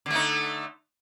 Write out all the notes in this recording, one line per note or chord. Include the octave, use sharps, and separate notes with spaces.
D3 A3 D#4